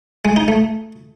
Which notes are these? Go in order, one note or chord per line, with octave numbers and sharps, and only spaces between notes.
G#3
D#4
A3